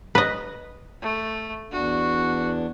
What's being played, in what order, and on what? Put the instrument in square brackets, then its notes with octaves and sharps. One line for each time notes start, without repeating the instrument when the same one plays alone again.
[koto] B4 D#5
[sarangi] A3
[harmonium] E2 D4 [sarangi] F#4